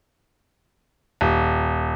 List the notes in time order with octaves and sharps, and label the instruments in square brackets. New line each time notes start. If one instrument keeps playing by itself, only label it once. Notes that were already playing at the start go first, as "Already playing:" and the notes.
[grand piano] D#1